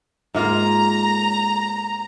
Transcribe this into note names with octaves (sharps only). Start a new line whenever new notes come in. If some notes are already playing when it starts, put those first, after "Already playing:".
G#2 A#3 F4 A#5